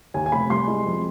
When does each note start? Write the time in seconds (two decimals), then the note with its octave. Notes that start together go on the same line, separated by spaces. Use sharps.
0.14 D#2 G#5
0.26 G#5
0.32 F1 B5
0.50 C2 C6
0.68 G#3
0.86 F2